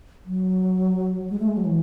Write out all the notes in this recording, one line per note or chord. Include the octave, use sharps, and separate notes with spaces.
F#3
G#3
A3
G#3
F#3
E3